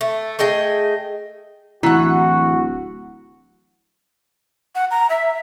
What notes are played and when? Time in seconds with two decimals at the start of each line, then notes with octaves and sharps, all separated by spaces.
0.01 A3
0.39 A3 G#4 D#5 G5
1.83 D1 E3 E4 F#4 F#5
4.75 F#5
4.91 A#5
5.10 E5